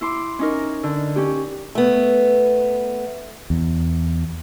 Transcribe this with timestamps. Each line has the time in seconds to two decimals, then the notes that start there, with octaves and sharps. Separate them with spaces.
0.01 E4 C6 D6
0.39 C#4 D#4 A#4
0.83 D3
1.16 C#4 G4
1.75 A3 B3
3.50 E2